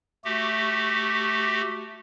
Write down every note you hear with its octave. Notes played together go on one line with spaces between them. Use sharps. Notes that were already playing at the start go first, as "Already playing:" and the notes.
A3 F#4 G4